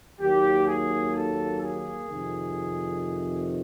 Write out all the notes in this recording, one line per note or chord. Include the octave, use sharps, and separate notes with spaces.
D#2 D#3 F#3 A#3 G4
G#4
A4
G#4
F2 C3 D#3